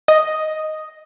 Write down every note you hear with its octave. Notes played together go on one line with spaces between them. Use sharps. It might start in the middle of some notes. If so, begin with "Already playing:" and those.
D#5